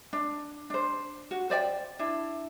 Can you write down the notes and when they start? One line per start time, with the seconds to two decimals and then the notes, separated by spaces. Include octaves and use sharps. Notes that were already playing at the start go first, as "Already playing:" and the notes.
0.13 D4
0.70 D4 C5
1.31 F#4
1.50 C5 D5 D#5 G5
1.99 D4 E4